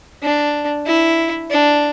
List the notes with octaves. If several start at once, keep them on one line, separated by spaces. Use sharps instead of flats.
D4
E4
D4